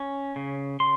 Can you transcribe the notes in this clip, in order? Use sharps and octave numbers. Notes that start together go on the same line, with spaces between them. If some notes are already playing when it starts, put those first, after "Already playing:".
Already playing: C#4
C#3
C#3 C6